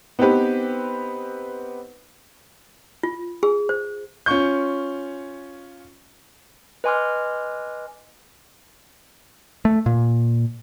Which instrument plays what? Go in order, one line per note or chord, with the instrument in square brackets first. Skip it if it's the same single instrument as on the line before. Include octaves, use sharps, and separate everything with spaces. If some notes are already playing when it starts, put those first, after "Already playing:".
[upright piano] B3 C4 D#4 G4 B4
[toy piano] F4
G#4
C5
[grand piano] C#4 F4 C#6 G6
[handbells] B4 D#5 G#5 C6 D6 F6
[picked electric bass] A3
A#2